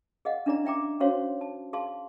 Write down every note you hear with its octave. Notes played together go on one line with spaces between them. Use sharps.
G#4 D#5 F5 F#5
C#4 D4 E4 G#4 D5 A#5
D5 E5 G5 A#5 D6
C#4 F#4 C5 C#5 F5 C6
A5
G#4 F5 A5 C6